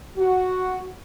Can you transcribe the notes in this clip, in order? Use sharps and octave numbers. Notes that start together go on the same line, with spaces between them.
F#4